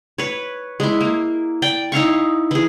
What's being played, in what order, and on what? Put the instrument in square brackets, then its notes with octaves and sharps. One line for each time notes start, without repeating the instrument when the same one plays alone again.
[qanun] B4 C#5
G#3 E4
A#3
D5 G5
D#4 E4 F5 C#6
E3 G#4